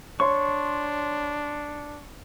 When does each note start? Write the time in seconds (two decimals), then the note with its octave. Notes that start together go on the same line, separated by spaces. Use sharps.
0.20 D4 C#5 C6 C#6